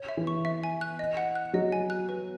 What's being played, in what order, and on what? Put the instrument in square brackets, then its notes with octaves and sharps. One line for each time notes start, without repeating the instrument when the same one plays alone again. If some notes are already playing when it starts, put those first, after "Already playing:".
Already playing: [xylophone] C#5
E5
[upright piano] E3
[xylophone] C#6
E5
G#5
F#6
D#5
F#5
F#6
[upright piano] F#3 [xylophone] D#5
[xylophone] G#5
F#6
B4